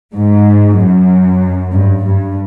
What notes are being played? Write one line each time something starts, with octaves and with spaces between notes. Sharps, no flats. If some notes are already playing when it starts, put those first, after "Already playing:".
G#2
F#2
G2
G2